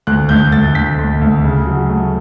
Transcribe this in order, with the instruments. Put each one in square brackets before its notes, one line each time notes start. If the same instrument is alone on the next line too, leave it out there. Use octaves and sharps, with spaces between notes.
[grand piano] D2 F#6
D2 G6
D2 A6
D2 B6
D2
D2
C#3
F#3
A3